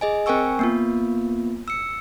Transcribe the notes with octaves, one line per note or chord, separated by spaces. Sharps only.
G#4 D#5 G#5
C4 A#4 G5 G#5 C#6 E6
A#3 B3 F4
E6 C#7